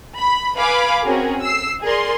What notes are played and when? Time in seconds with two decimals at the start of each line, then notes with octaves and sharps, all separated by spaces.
0.18 B5
0.58 B4 F5 G#5 B5 D6
1.03 C4 C#4 F#4 G#4 A#4
1.41 E6 C7
1.82 G#4 A#4 D5 C6